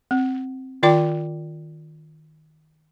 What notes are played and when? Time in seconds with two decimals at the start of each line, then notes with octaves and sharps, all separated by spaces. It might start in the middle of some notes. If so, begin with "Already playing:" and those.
0.11 C4
0.83 D#3 F4 D5 G5 D6